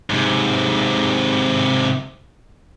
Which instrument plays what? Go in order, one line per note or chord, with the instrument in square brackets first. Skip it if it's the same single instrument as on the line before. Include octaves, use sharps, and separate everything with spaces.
[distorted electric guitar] G#2 C3